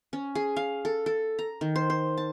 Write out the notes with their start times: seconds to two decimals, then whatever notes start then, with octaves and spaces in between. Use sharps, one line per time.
0.13 C#4
0.35 G#4
0.56 F5
0.85 A4
1.06 A4
1.39 A#5
1.61 D#3
1.76 C5
1.90 C5
2.17 A5